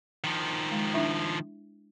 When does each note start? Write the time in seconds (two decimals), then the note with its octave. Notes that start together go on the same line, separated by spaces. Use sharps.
0.24 D#3 F3
0.72 G#3
0.94 D4 E4 E5